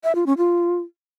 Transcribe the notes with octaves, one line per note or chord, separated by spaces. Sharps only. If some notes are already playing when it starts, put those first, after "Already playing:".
E5
F4
C#4
F4